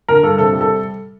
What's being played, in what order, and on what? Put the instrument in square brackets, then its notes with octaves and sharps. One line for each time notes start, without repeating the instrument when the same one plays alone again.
[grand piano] D3 A#4
G2 A4
C3 A4
G3
A4